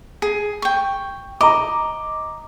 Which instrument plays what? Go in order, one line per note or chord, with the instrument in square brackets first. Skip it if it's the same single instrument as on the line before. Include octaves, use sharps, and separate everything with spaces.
[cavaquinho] G#4
G5 C#6
[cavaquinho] D#5 [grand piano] A#5 D6